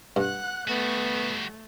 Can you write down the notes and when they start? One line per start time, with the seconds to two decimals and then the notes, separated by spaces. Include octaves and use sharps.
0.16 G2 F#5 F#6
0.68 G3 A3 B3 F#4